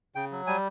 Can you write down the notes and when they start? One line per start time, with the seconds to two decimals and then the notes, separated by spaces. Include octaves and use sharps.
0.15 C#3 G5
0.31 F#3
0.47 G3 G#5